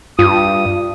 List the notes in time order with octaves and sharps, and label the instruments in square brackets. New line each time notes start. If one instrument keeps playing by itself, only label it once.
[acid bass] G2 [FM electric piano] F4 [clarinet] D#6